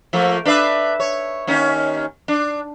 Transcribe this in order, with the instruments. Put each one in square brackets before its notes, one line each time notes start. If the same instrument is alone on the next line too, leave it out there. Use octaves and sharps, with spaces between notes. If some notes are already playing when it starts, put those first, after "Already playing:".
[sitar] F3 A3 A#3
D4 B4 E5
C#5
D#2 C#4 D#4
D4